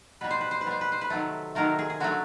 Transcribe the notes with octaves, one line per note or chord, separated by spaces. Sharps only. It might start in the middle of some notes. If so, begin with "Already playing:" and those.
B2 G3 B4
C5
B4
C5
B4
B2 G3 C5
B4
C5
B4
C3 D#3 F#3 A3
C3 D#3 F#3 A3 A#4
G#4
G#4
D3 F#3 A3 F#4